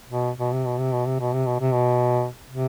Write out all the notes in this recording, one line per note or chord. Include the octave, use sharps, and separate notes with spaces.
B2
B2
C3
B2
C3
B2
C3
B2
C3
B2
C3
B2
C3